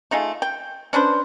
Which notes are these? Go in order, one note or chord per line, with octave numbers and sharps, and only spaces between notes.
A3 D#4 F4 G#4
G5
C#4 D4 B4 C5